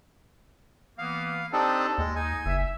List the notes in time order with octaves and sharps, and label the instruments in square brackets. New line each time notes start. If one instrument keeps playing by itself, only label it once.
[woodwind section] E3 A#3 B3 [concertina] F5
[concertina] C4 D4 D#4 [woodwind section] G4 A4
[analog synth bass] D#2 [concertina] G#3
[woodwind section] D#4 [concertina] G#5
[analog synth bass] F#1 [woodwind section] E5